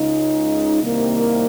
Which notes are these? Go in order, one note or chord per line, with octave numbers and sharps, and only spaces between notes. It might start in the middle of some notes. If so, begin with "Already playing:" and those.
Already playing: C#2 C#3 G#3 D#4
C2 C3 D#3 A#3